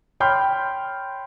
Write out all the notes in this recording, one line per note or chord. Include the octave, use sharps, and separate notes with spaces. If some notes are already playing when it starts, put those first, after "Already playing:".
C#5 G5 B5 C6 F6 G6